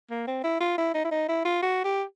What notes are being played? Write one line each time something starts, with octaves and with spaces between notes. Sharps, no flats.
A#3
C4
E4
F4
E4
D#4
E4
D#4
E4
F4
F#4
G4